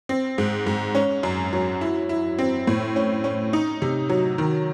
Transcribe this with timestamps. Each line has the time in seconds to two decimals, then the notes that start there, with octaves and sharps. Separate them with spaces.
0.09 C4
0.38 G#2
0.67 G#2
0.95 C#4
1.23 F#2
1.53 F#3
1.81 E4
2.09 E4
2.39 C4
2.67 A2
2.96 C#4
3.24 C#4
3.53 D#4
3.82 C3
4.10 F#3
4.38 D#3